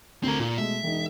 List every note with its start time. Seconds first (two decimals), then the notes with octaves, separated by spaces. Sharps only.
0.23 D2 C4 A#4
0.40 A#2 F4
0.58 B2 G#3 A3 E5
0.83 E1 D#4